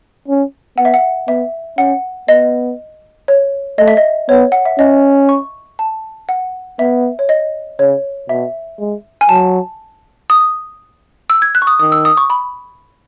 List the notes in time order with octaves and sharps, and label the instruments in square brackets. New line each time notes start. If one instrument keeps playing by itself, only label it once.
[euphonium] C#4
[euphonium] B3 [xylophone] F#5
[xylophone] E5
F#5
[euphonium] B3 [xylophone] E5
[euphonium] C#4 [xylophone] F#5
[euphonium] B3 [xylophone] D#5
[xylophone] C#5
[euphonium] A3 [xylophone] D#5
[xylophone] E5
D#5
[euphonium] B3 [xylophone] C#5
[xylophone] F#5
E5
[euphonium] C#4 [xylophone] D#5
[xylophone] C#6
A5
F#5
[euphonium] B3 [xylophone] E5
[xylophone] C#5
D#5
[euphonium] C#3 [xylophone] C#5
[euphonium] B2 [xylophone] E5
[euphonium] G#3
[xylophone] G#5
[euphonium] F#3 [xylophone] A5
[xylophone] D#6
E6
G#6
F#6
C#6
D#6
[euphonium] D#3 [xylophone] D#6
[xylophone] E6
D#6
C#6
B5